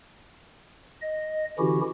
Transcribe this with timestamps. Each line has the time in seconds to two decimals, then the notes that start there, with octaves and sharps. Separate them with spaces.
1.02 D#5
1.59 D3 E3 C#4 E4 F#4 G4